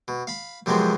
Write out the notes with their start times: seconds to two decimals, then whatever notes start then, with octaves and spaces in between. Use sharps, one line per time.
0.08 B2
0.27 F5 B5
0.66 F#2 C3 F3 G#3 B3 C4